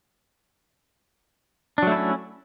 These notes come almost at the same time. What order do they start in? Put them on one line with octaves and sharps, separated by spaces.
D4 F#3 A3 E4 C#4